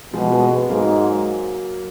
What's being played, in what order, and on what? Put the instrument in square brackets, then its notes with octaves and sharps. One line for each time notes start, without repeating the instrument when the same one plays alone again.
[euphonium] B2 [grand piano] F3 G#3
[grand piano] G#3 B3
G#3 B3
[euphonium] G#2 [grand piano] F#3 A#3